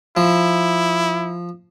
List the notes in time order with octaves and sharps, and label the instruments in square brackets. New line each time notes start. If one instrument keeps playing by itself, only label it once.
[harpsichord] F3 [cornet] E4